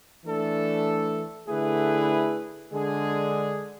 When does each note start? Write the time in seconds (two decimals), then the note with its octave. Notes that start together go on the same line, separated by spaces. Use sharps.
0.24 E3 A3 D4 A4
1.47 D3 A3 E4 G#4 B4
2.71 D3 G#3 D4 G#4